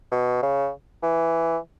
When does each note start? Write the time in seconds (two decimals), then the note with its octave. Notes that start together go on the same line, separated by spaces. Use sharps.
0.11 B2
0.42 C#3
1.03 E3